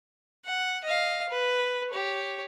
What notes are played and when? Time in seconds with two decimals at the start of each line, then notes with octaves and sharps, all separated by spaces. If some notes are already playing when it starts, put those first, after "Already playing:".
0.45 F#5
0.84 D#5 F5
1.29 B4
1.90 G4 C#5